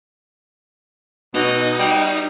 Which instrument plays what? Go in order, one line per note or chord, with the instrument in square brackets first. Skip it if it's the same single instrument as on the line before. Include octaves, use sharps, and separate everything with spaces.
[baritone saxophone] B2 [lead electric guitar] D#4
[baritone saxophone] G3